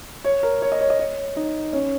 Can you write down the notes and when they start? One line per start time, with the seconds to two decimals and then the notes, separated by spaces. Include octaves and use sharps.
0.24 C#5
0.43 A#4
0.62 C#5
0.72 D#5
0.81 C#5
0.90 D#5
0.99 C#5
1.36 D#4
1.73 C#4